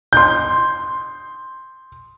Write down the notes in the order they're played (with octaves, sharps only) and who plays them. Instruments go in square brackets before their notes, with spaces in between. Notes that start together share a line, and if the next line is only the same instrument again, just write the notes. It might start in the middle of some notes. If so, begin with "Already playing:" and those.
[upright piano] C6 G6